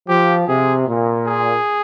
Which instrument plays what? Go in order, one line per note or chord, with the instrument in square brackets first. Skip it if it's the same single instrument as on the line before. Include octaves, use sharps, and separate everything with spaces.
[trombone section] F3 [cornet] G4
[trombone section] C3 [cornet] G#4
[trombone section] A#2
[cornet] G#4